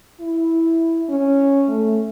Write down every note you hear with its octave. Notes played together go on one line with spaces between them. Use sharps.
E4
C#4
A3